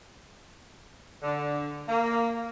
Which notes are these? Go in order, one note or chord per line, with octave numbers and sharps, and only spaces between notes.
D3
A#3